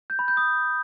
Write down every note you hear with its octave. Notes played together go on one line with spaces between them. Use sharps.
G6
B5
G6
D#6